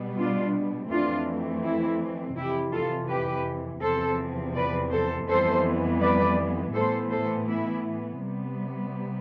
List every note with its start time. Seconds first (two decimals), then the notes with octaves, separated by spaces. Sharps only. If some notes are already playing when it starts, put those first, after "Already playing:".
Already playing: B2 G3 B3
0.18 D4 F4
0.90 F2 E3 A3 C4 D4 F4
1.64 E4
2.37 F2 C3 E3 E4 G4
2.73 F4 A4
3.09 G4 B4
3.82 E2 C3 F3 C4 A4 C5
4.55 B4 D5
4.92 A4 C5
5.28 F2 E3 G3 B3 A4 C5
6.01 B4 D5
6.75 A2 E3 B3 A4 C5
7.11 A4 C5
7.48 E4
8.20 C3 G3 B3